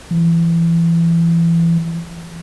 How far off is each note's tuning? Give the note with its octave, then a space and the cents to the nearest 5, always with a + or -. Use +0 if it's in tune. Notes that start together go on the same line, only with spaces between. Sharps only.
E3 +25